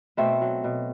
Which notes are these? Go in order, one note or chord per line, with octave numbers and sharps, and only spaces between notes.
B2 A3 C4
F#3
B2